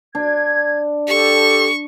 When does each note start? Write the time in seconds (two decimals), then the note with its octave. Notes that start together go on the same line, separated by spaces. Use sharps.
0.15 D4 G#6
1.08 G4 A4 C#6